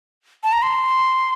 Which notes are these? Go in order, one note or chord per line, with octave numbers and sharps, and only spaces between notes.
A5
A#5
C6